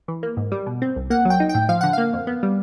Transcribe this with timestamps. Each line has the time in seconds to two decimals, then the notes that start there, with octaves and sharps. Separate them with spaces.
0.08 E3
0.23 A#3
0.37 G#2
0.52 G3
0.66 B2
0.82 C4
0.96 C2
1.10 A#3 F#5
1.25 F#3
1.30 G5
1.40 D#4
1.49 G5
1.55 A2
1.69 F3 F5
1.81 D3 F#5
1.93 A#3 F5
2.13 F2
2.27 B3
2.43 G3